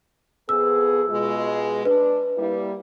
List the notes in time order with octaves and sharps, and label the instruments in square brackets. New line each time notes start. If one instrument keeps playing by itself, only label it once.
[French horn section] F2 B3 G#4 [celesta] E6
[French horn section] B2 G#3 F4
[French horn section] D4 [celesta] B4
[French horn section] G3 A#3 E4